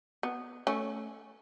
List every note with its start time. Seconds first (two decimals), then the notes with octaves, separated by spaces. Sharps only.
0.23 B3
0.67 A3 C#4